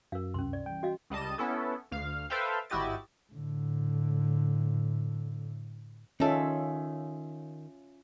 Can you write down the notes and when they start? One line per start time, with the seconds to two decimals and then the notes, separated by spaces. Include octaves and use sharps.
0.12 F#2 F#4 A#4 F5
0.34 C#2 G2 C3 C#4 C6
0.53 D5
0.66 E3 G3 G5
0.83 F#4 D#5 F5
1.10 C#2 G3 D#5 A5 D#7
1.38 B3 C#4 E4 A4
1.91 D2 F5
2.30 A4 B4 C5 E5 F5 G5
2.70 G#1 E4 F#4 G4 D#5 A6
3.33 A2 D3
6.20 D#3 C#4 F4 A4 E5